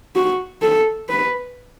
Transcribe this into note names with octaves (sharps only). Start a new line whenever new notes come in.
F#4
A4
B4